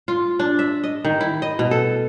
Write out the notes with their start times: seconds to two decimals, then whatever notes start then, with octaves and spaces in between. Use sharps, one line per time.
0.08 F4
0.39 D4
0.59 E5
0.83 D#5
1.05 D#3
1.21 E4
1.42 D#5
1.59 B2
1.71 A4